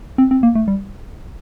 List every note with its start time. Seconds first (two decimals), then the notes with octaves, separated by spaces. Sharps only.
0.18 C4
0.31 C4
0.43 A#3
0.55 A3
0.68 G3